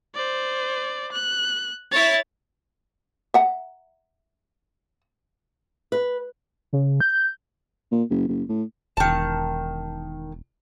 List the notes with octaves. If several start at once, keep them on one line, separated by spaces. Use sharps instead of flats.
C5 D5
F#6
E4 C#5 A6
E5 F#5 A#5
B4
C#3
G6
A#2
F#1
F#1
A2
E1 D#3 A5